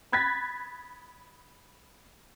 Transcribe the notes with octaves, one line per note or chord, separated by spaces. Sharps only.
B5 F#6 G#6 A6 B6